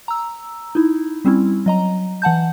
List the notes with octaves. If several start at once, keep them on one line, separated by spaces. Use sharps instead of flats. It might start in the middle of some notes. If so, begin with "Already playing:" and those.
A#5 E6
D#4 E4
G3 C4 C#4 E4
F#3 D#5 A#5
E3 F#5 A5 G6